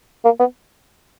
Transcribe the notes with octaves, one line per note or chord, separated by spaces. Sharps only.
A#3
B3